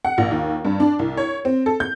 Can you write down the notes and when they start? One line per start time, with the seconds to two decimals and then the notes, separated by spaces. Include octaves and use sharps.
0.05 F#5
0.18 A#1
0.31 D#2
0.65 G2
0.80 D4
0.99 C2
1.17 C#5
1.45 C4
1.66 A4
1.80 G6